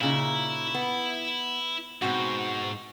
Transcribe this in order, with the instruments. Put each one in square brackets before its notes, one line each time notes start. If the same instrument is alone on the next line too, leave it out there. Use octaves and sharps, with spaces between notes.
[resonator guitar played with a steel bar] A#2 C#3 D#4 [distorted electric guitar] E4
[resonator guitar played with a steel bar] B3
[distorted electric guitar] G#2 [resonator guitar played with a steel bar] B2 C4 F#4